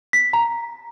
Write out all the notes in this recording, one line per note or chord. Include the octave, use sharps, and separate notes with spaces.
B6
A#5